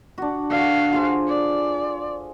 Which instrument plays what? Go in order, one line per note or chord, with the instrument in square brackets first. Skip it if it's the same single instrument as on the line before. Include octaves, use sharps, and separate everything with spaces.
[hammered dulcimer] D4 F#4
[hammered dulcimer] D3 [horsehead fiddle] F#4 F5
[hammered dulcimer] F4 G#4 C5
[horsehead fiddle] D5